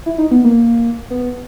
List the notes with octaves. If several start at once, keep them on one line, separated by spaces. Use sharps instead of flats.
E4
D#4
B3
A#3
B3